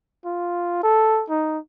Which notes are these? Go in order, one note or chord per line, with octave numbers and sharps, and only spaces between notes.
F4
A4
D#4